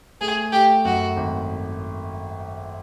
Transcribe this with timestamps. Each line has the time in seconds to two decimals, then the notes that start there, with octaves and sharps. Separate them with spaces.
0.21 A3 G#4
0.52 A3 G4
0.85 F#2 F#4
1.17 G#1